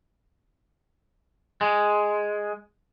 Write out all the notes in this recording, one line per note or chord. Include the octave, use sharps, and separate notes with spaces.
G#3